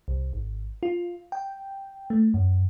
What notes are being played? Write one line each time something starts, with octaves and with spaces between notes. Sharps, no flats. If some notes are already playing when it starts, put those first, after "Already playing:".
C2
G#1
F4
G5
A3
F#2